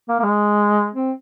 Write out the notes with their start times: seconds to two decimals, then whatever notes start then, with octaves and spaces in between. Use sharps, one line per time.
0.09 A#3
0.20 A#3
0.23 G#3
0.95 C4